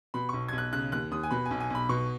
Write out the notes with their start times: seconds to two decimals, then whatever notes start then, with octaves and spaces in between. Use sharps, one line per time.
0.14 B2 B5
0.29 B1 C#6
0.49 B1 G#6
0.58 F#6
0.73 C#3 F#6
0.92 D#2 F#6
1.11 D#2 D#6
1.23 G#5
1.31 B2 B5
1.46 G#5
1.51 B1
1.60 G#5
1.70 B1 B5
1.89 B2 C#6